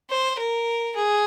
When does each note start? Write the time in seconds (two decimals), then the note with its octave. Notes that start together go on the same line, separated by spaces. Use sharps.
0.10 C5
0.39 A#4
0.95 G#4